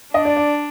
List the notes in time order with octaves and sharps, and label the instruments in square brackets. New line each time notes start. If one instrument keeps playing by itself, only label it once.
[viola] D4 [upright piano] D#5
[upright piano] D5
D5